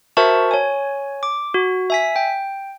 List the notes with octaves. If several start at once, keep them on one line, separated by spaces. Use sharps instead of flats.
F#4 A#4 C5 E5 A5 C#6
C#5 G#5
D6
F#4
E5 G#5 B6
G5